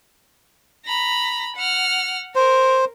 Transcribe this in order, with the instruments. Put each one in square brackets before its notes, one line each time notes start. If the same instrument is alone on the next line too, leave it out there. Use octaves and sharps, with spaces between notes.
[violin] A#5 B5
F#5 F6
[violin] A#4 [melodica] C5